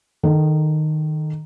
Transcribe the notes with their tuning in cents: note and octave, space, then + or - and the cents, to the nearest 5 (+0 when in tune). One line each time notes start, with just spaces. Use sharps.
D#3 -10 A4 +0